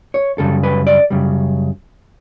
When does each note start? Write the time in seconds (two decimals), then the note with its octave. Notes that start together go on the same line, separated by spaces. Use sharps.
0.14 C#5
0.38 F#2 C#3 G3 A4
0.63 B4
0.87 D5
1.10 F#2 C#3 G3